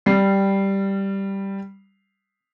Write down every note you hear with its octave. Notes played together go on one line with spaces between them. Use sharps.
G3 C7